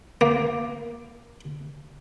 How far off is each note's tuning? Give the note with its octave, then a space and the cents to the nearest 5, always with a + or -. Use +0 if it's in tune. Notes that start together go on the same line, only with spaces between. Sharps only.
A#3 +15